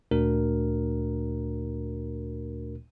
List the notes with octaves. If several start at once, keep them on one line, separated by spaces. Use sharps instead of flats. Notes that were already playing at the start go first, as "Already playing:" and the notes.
D2 A#2 A3 D4 F#4 A#4